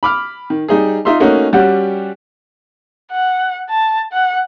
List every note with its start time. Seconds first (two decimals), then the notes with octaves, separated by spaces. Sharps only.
0.03 B5 D6 F6
0.50 D#3
0.68 G3 D#4 G#4
1.05 D#4 F4 E5 C6
1.20 A3 A#3 C#4 D#4 F#4
1.53 G3 C#4 F#4 G4 D5 F#5
3.12 F#5
3.70 A5
4.13 F#5